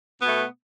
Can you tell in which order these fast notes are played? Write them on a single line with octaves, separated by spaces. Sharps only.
B3 B2 A3